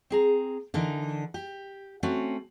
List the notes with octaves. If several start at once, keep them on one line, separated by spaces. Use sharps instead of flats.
C4 G#4 A#5
D3 E3 D#4 A#4
G4
A3 C4 C#4 F#4